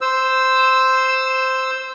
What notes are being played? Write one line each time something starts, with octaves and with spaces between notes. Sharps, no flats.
C5 E6